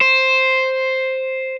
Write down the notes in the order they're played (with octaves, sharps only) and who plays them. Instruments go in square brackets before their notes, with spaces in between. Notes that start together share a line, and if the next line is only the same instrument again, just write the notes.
[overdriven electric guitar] C5